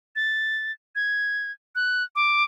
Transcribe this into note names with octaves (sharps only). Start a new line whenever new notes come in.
A6
G#6
F#6
D6